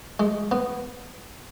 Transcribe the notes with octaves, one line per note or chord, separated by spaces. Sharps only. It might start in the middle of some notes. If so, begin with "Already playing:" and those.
G#3
B3